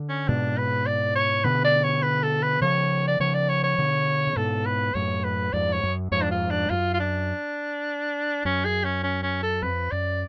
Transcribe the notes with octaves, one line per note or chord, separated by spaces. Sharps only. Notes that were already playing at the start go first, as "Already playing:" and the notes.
Already playing: D3
C#4
G#2 B2 D4
B4
D5
C#5
B2 D3 B4
D5
C#5
B4
A4
B4
C#3 F3 C#5
D5
C#3 F3 C#5
D5
C#5
C#5
B2 D3
C#3
G#2 B2 A4
B4
F#2 A2 C#5
B4
F2 G#2 D5
C#5
F#2
F2 G#2 C#5
D4
F4
D4
F#2 F4
F4
D4
F#2 C#4
G#4
C#4
C#4
C#4
A4
F2 B4
F#2 D5